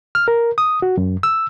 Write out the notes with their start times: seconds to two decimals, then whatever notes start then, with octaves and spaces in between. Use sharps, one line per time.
0.15 F6
0.28 A#4
0.58 D#6
0.82 F#4
0.97 F#2
1.23 E6